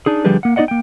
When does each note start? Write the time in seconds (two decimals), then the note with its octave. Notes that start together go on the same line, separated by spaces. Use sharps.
0.06 D4 D#4 G#4
0.25 D3 F3 G3 G4 G#4 B4
0.43 A#3 F#5
0.56 B3 D#4 F#4 D5 D#5 F#5
0.68 A#3 G5